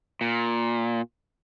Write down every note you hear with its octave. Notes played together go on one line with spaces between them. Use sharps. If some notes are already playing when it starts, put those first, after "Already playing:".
A#2